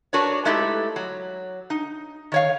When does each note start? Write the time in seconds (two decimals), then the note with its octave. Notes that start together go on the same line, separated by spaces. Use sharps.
0.13 D4 F#4 A#4 B4 C#5
0.45 G#3 A3 D#4 E4 G4 A4
0.96 F#3
1.70 D#4
2.32 D#3 C#5 F5